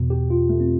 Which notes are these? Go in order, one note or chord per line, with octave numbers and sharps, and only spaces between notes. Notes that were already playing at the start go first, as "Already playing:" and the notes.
Already playing: E2 B2
G4
F4
A3
C4